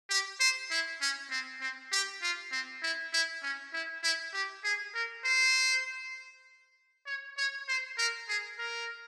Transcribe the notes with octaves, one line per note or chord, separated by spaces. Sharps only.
G4
C5
E4
C#4
C4
C4
G4
F4
C4
E4
E4
C#4
E4
E4
G4
G#4
A#4
C5
C#5
C#5
C5
A#4
G#4
A#4